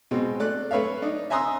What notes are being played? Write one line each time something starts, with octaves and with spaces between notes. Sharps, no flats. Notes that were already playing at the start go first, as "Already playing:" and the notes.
B2 G#3 C4
A3 D5 F#6
A3 B4 C#5 E5 F5
D4 D#4
E5 G#5 A#5 C6 D#6 E6